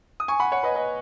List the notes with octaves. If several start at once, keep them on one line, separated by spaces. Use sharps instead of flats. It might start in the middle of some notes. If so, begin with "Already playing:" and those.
D#6
G#5 C#6
F#5 B5
C#5 F#5
B4 D#5
B4 D#5